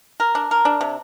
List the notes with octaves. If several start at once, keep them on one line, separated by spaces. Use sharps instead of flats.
A#4
D4
A#4
D4
C3